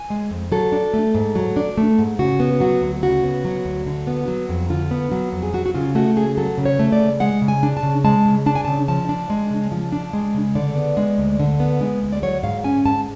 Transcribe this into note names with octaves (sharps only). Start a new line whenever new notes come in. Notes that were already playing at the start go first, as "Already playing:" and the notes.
Already playing: G#5
G#3
F2
F#3 A4
D4
A3
G#2
F#3
D4
A3
G#2
C#3 F#4
B3
F#3 F#4
D2
C#3 F#4
B3
F#3
D2
D3
B3
F#3
F2
D3 F4
B3
F#3
F2
G#4
F#3 F#4
F#4
C#3 F4
A3 F#4
C#3 G#4
F#3 A4
C#3
C#5
A3
D5
C#3
G#3 F#5
C#3
G#5
D4
A5
C#3
G#3 A5
C#3
D4 A5
G#5
C#3 A5
F3 A5
D4
G#3
C#3
F3
D4
G#3
C#3
D3 D5
B3
G#3
D2
D3
B3
G#3
D2
D5
F#3 C#5
G#2 F5
C#4 G#5
G#2 A5